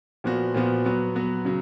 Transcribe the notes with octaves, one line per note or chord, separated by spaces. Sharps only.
A#2 F3 B3 F#4
A#2 F3 B3 F#4
F#3 B3 F#4
F#3 B3 F#4
C#3 F#3